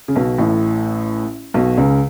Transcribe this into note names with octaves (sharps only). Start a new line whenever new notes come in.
C#3
B1 B2
A1 A2
B1 B2
C#2 C#3